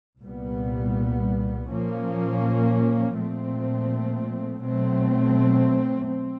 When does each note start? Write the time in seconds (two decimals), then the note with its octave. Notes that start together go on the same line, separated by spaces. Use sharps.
0.22 C2 A#2 G3 B3
1.69 A#2 F3 A#3 C#4
3.16 A#2 F3 A3 C4
4.62 B2 F#3 A3 C4
6.09 C4